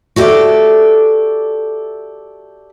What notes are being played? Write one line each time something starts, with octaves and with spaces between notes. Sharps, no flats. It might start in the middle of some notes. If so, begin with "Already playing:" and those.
F#4 G4 A4 B4 D5 E5